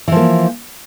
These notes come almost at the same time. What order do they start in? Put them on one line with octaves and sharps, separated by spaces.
E3 F3 A#3